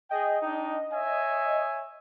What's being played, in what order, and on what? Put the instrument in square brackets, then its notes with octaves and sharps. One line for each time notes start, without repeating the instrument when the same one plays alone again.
[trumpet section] G#4 G5 [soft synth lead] D#5
[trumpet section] D4 D#4 G5
C#5 E5 G#5